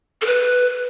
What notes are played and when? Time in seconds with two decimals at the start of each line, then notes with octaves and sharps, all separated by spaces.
0.22 A4
0.26 B4